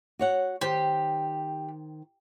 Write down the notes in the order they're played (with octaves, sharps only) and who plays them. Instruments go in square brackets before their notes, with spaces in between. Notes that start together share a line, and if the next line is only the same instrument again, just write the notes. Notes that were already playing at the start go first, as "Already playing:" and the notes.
[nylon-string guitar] F#4 C#5 F#5
[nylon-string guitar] D#3 C5 [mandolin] G4